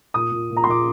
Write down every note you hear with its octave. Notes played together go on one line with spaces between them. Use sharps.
A#2 D#6
A#2
A#2
A#5
C6
A#2 D6